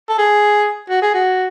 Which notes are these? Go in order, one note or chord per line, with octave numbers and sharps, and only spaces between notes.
A4
G#4
F#4
G#4
F#4